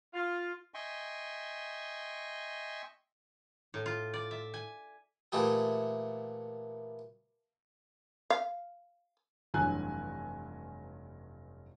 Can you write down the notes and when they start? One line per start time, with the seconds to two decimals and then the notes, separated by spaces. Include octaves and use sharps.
0.14 F4
0.74 D#5 E5 G5 G#5 C6 C#6
3.74 A2
3.86 F4
4.14 D5
4.31 E5
4.54 G#5
5.32 A#2 E3 A3 G4 G#4
8.30 F5
9.54 F1 G2 E3 F#3 G#5 F#6